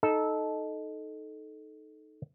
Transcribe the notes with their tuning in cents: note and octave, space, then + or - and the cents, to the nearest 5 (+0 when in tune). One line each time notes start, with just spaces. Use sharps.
D#4 +0 A4 -15